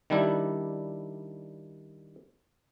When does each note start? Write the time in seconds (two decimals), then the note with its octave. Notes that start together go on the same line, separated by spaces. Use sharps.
0.10 D#3 G3 D4 E4